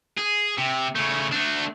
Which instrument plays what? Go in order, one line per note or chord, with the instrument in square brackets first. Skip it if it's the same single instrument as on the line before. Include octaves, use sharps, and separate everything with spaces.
[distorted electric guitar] G#4
C3
C#3 A3
A3 D4